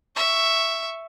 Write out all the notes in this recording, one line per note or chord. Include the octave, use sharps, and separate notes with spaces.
E5 C#6